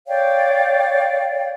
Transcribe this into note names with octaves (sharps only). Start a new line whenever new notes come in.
C#5 D5 F5 G5